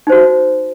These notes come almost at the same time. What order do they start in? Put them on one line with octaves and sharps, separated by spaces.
D#4 C5 F#4